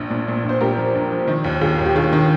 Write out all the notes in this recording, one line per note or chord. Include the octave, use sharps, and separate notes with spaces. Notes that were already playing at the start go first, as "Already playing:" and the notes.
Already playing: A#1
A#2
A#2
A#1
C5
A#2 G4 A#4
F3
A#1
F3
D#3
D#2
D#2 F4 G#4
D#2
G4
D#3 F4 G#4
D#3